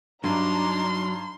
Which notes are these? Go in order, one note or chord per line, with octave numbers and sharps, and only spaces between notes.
G2 F#3 D4 D#4 A#5 C6